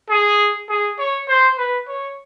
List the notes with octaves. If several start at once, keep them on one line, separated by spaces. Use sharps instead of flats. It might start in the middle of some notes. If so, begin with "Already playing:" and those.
G#4
G#4
C#5
C5
B4
C#5